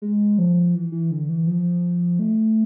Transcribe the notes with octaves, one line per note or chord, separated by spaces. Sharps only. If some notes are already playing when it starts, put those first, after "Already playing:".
G#3
F3
E3
E3
D3
E3
F3
A3